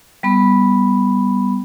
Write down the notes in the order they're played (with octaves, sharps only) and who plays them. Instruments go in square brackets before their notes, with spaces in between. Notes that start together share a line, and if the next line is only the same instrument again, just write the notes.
[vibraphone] G3 B3 B5